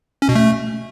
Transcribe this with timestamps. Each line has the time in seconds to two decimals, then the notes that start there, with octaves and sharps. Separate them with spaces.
0.22 C#4
0.29 B2
0.35 A3